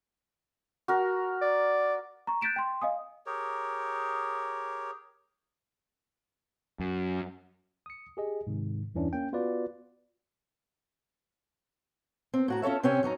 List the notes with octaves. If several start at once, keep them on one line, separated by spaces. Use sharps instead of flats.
F#4 A#4
D5
A#5 C#6
F#6 G6 A6 B6 D7 E7
G5 C6
D#5 F5 G#5 D#6
G4 G#4 A#4 C#5
F#2
D#6 C#7
G4 G#4 D#5
G#2 C3 D#3
E2 G2 E3 C#4 D4 E4
A#3 C#4 G5
B3 F4 F#4 B4 D5
C4
A2 F#4 A#5
C#4 F4 A4 C#5 E5
C3 C4 C#4 C#5 G5 G#5
F#2 C#4 D#4 A#5